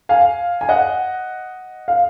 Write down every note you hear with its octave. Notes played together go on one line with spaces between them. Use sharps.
F5 G#5
G#5
D#5 F#5
F5